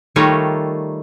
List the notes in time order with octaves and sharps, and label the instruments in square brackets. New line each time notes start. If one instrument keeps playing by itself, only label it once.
[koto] D#3 G3 A3 F4 A#4 C#5